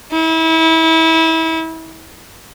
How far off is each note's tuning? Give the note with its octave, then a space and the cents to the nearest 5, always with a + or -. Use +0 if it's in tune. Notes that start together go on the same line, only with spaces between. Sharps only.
E4 -30